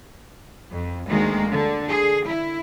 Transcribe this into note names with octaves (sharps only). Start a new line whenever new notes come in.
F2
D2 D#3 G#3 A#3
D3
G#4
E4